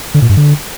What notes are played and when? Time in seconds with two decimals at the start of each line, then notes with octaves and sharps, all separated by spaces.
0.14 D3
0.22 A#2
0.29 G2
0.37 D3